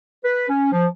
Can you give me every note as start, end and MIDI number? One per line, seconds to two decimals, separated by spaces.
0.25 0.46 71
0.49 0.70 61
0.72 0.86 53